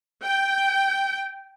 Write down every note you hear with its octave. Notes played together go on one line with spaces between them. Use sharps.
G5